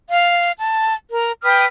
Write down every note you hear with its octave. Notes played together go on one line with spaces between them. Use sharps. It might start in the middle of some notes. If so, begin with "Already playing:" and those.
F5
A5
A#4
B4 G5 D#6 F6